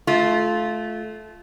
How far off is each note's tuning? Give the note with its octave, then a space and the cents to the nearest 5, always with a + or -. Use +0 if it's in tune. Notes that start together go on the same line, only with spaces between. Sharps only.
A3 -20 F4 +0